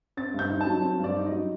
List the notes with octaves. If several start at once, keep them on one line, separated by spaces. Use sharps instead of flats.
C4 A6
G2 G6
D#4
A5
F#3
C4
G2 D5
D#4
D#5
F#3